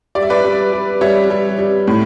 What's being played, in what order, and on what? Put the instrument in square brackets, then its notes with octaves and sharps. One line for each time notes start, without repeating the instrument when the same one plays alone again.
[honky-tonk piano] G3 D5
E5
B4 D5
G3
G3
G3 C#5 E5
G3
G3
A2